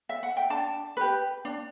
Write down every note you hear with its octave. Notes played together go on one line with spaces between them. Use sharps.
E5
F#5
G5
D4 A5
G4 B4
D4